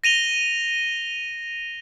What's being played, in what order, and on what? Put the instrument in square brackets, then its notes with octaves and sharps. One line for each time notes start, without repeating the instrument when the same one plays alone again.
[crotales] A#6 D#7 F7 G7